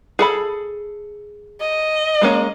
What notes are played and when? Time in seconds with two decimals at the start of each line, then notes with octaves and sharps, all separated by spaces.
0.19 G#4 A4 B5
1.60 D#5
2.21 G#3 A#3 C#4